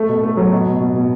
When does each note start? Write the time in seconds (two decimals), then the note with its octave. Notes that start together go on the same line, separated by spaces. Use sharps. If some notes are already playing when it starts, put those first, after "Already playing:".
Already playing: A3
0.09 B2
0.24 A3
0.37 F#3
0.52 B2
0.67 B2
0.80 B2
0.96 B2